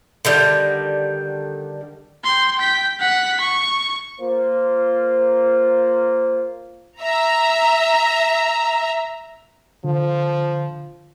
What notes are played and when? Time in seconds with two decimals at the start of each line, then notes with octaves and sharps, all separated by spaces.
0.25 D3 D#3 G3
2.24 G5 C6
2.57 G5 B6
3.00 F#5 B6
3.40 C#6
4.20 A#3 F4 C5
7.02 E5 A#5
9.84 D3 F3